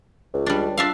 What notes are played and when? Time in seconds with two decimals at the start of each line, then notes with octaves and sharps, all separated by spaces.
0.33 C#2
0.46 G3 D4
0.78 D4 F4 E5 F5